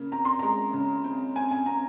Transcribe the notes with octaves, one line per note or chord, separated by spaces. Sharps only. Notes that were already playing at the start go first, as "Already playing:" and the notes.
Already playing: C#3 A#3
C4 A#5
C6
G#3 A#5
C#3
C4
C4 G#5
G#5
C4 A#5